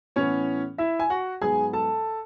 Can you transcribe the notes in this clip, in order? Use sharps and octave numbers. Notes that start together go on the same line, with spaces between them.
A2 E3 B3 C#4 C#5
E4 E5
G#5
F#4 F#5
G#2 F#3 B3 G#4 G#5
A4 A5